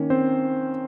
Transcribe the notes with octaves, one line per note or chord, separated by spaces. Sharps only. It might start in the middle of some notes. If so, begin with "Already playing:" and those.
Already playing: D#3 A#3 C#4
C4 C5